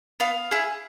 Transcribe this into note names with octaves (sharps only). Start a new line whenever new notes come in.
B3 F5
E4 G#4